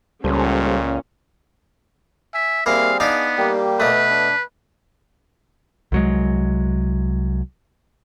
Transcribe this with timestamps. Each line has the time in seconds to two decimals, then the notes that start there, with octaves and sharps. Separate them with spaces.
0.24 C#2 A#2 G3 C#4 A4 C5
2.34 E5 G#5
2.66 G3 A#3 C4 E4 G#4 F5
3.00 B3 D4 D#4 G#4 F5
3.37 G3 A#3 G4
3.80 B2 A3 B4
4.10 D4
5.92 C2 F#3 G#3